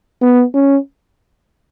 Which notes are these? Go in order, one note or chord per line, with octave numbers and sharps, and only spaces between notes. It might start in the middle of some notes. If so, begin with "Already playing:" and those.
B3
C#4